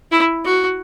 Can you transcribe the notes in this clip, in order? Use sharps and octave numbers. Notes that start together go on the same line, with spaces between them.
E4
F#4